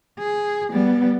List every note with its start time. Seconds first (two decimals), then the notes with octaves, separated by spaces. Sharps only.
0.19 G#4
0.72 G3 B3